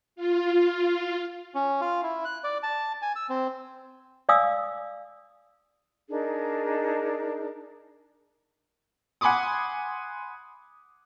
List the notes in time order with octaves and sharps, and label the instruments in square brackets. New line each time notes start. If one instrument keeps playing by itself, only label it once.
[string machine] F4
[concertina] C#4
F4
E4
F#6
D5
A5
G#5
E6
C4
[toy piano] D5 F5 G#5 D#6 E6
[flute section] D4 D#4 G#4 A#4
[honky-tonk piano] F#5 G#5 B5 C6 D6 D#6